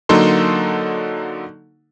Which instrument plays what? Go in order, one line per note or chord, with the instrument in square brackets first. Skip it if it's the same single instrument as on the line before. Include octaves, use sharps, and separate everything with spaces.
[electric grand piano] D3 F#3 A#3 D#4 A4 C6